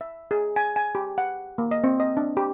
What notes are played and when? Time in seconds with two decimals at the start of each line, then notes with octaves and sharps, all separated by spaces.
0.01 E5
0.31 G#4
0.56 G#5
0.76 G#5
0.95 G4
1.18 F#5
1.58 A#3
1.71 D#5
1.84 C4
2.00 D#5
2.17 D4
2.37 G4